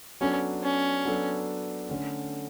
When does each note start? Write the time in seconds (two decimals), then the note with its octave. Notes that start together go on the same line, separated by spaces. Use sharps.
0.21 F#3 B3 C#4 D4 A4
0.63 C#4
1.05 F#3 B3 D4 A4
1.89 D3 A3 C#4